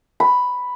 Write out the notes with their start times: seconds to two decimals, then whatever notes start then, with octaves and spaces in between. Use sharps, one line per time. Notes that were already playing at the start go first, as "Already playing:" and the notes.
0.20 B5